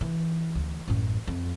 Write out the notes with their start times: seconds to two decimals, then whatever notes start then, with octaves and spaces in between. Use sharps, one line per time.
0.01 E3
0.55 D2
0.88 A1 F#2
1.27 F2